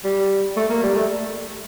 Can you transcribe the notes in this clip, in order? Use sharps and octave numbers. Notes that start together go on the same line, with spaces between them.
G3
A3
A#3
G3
A3